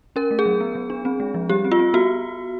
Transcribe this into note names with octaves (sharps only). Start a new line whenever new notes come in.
C#4 A#4
A3
G#4
F#3
B3
F#3
D4
C4
G#3
F3
G3 G4
C4
F4
C4
B3 F#4